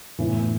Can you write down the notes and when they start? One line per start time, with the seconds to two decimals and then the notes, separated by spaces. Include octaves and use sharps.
0.19 A2 E3 B3